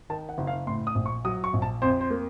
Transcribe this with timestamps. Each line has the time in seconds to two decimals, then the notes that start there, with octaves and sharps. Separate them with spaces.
0.10 D#3 A5
0.29 F#5
0.38 F#1
0.47 F5
0.67 A2 C6
0.87 D#6
0.95 A#1
1.06 C#6
1.25 F#3 D#6
1.44 C#6
1.53 A#1
1.62 A5
1.82 F2 C5
2.01 C5
2.10 A#3